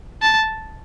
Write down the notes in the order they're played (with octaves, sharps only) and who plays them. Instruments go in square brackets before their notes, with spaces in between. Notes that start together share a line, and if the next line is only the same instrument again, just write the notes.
[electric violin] A5